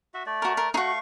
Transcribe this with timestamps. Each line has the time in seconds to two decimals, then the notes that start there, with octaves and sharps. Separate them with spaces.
0.14 F#4 E5
0.26 A3 D5
0.42 F#4 A#4
0.57 A#4
0.74 A3 D#4 F#4 F5 C#6